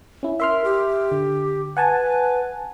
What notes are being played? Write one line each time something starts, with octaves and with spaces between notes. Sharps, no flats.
C#4 E4
A#4 E5 C6 F6
G4
D3
B4 F#5 G#5 A5